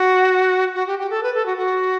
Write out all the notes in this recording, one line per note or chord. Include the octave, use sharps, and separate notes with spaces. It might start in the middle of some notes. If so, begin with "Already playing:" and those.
Already playing: F#4
F#4
G4
G4
A4
B4
A4
F#4
F#4